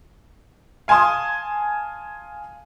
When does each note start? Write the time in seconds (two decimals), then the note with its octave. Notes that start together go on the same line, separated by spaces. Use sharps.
0.88 F5 G#5 A5 C6 D#6